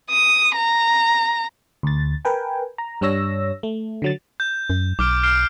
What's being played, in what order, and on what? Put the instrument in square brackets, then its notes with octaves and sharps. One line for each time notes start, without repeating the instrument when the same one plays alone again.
[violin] D#6
A#5
[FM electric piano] D2 A6
A#4 B4 G5 G#5
A#5
G2 G3 D4 C#5 E6 A#6
A3
D3 F#3 A6
[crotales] G6
[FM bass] F#2
[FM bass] B1 [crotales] D6 F6 D7
[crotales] F6 C7 D7